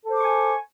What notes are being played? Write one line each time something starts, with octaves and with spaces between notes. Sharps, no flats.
A4 C5 G#5 C#6 D6